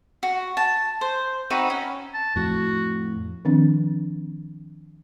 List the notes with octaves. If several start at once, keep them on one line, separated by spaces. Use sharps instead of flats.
F#4
A5
C5
C4 D#4 F#4 B4
C#4
A5
F2 A2 F#4
D#3 F3 C4 D4